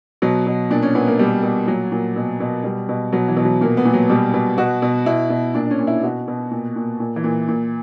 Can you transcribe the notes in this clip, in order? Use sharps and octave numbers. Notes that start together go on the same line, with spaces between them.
B2 F#3
B2
A#2 D4
C#4
A#2 B3
A#3
B2 G3
B2
A#2 F#3
A#2
B2
B2
B2 G3
B2
B2 F#3
E3
B2
F#3
A#2 A#3
B3
A#2
F#3
B2 G3
B2
B2 F#4
B2
B2 E4
B2
A#2 D4
D4
C#4
A#2
E4
B2 F#4
B2
A#2
A#2
A#2
E3
A#2
A#2